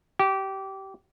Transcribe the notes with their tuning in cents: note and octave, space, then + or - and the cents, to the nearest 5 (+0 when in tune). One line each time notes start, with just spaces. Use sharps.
G4 -20